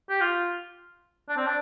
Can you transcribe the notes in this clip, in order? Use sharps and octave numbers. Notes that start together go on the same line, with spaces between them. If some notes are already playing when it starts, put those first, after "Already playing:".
G4
F4
D4
C4
D4